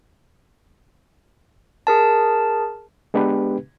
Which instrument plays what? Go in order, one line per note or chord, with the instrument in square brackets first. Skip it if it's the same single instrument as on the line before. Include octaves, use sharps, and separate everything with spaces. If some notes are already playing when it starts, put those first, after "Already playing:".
[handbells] G#4 A#4 A5
[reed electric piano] G#3 B3 D4 G4 B4